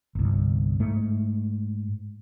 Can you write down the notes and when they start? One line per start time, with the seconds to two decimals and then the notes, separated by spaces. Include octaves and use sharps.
0.15 G1 C2
0.80 G#2 A3